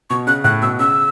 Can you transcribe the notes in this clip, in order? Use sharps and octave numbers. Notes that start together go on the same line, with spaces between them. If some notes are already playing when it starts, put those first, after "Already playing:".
B2 C#6
C#3 F#6
A2 F#6
B2 E6
C#3 E6